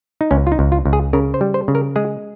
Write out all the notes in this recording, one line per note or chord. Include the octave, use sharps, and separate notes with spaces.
D#4
C#2 C#4
F4
D#4
C#2
F4
C#2
G#4
C#3 A#4
C5
G3
C5
C#3
A#4
G#3 G#4